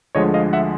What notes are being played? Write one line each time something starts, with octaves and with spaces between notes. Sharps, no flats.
D2 D3 F3 G#3 C#5 D#5
D#5 F5
E5 F#5